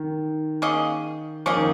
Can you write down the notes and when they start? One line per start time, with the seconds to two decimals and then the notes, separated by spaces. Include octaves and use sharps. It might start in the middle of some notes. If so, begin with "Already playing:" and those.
Already playing: D#3
0.62 A#3 C#4 G#4 D#5
1.46 F3 A#3 C#4 G#4 D#5
1.57 D#3